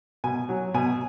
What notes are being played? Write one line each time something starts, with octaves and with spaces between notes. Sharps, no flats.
B2 G#5
F#3
B2 G#5